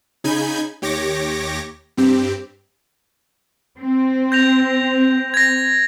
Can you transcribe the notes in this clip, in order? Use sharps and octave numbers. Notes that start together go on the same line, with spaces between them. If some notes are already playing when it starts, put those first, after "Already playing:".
C#3 D#4 G#5 B5 G6 G#6
D#2 G4 C#5 D6 A#6
G2 C4 G4
C4
G6 A#6 F7
G#6 A#6